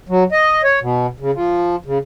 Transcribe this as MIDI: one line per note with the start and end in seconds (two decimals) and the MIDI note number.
0.09 0.24 54
0.32 0.62 75
0.64 0.79 73
0.82 1.07 47
1.20 1.31 49
1.34 1.76 53
1.86 1.98 49